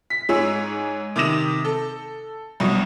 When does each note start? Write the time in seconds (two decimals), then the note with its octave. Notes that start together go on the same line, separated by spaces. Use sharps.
0.10 B6
0.29 G#2 G#4 C#5 E6
1.16 C3 D#3 D6 D#6 A#6 E7
1.65 A4
2.60 C2 G2 B2 F#3